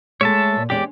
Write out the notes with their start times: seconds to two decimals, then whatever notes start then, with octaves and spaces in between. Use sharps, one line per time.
0.21 G#3 A3 C#5 E5 A5
0.56 A#2
0.70 E2 G#3 C#4 G4 D5